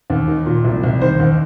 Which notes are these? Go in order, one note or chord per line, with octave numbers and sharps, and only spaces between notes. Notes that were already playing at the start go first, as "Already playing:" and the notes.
D#2
D#3
A#2
C2
C2
D#3 C5
D#2